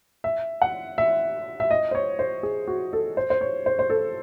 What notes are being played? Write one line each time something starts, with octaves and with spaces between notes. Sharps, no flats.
E5
F#5
E5
E5
D#5
C5
C#5
C5
G#4
F#4
A4
C5
C5
C#5
C5
C5
A4